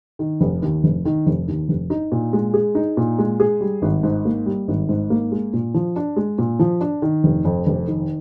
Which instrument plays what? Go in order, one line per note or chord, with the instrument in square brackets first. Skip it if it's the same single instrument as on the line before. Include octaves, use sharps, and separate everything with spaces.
[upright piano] D#3
F1
D#2
F1
D#3
F1
D#2
F1
D#4
A#2
G#3
G#4
D#4
A#2
G#3
G#4
G3
G#1
G#2
A#3
G3
G#1
G#2
A#3
G#3
A#2
F3
D4
G#3
A#2
F3
D4
D#3
F1
F2
F1
D#3